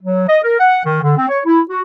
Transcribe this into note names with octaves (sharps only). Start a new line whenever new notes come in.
F#3
D#5
A#4
F#5
D#3
D3
C4
C#5
E4
F#4